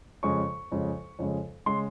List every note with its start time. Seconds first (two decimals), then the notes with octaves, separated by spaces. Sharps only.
0.23 F2 C#3 G#3 C#6
0.72 F2 C#3 G#3
1.19 F2 C#3 G#3
1.66 C#3 G#3 C6